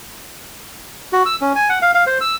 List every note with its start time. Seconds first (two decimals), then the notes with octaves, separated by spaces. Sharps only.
1.13 F#4
1.26 E6
1.41 C#4
1.56 G#5
1.69 F#5
1.82 F5
1.95 F5
2.06 C5
2.21 E6